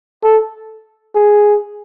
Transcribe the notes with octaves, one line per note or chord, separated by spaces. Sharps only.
A4
G#4